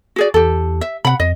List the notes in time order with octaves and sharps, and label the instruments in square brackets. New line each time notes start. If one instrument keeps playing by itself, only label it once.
[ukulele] F#4 G#4 D5
[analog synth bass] E2 [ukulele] G4 A4
[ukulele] E5
[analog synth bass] C3 [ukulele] F#5 B5
[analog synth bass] F2 [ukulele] D#5